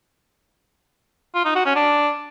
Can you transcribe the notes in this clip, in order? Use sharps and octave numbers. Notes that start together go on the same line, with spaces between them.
F4
D#4
F#4
C#4
D4